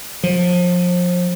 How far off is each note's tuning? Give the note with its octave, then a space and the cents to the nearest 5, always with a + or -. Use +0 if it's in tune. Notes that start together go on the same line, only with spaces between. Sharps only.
F3 +30